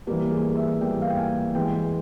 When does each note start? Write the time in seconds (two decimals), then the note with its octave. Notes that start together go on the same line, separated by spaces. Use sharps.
0.07 E3 G3 A#3 G4
0.32 G#4
0.56 E5
0.81 E3 G3 A#3 G5
1.02 F5
1.10 G5
1.18 G#5
1.55 E3 G#3 G5